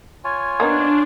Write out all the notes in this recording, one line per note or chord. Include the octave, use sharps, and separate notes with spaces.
F4 C#5 G#5
A#3 B3 D4 D#4